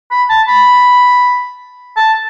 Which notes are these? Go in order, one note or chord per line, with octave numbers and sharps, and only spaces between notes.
B5
A5
B5
A5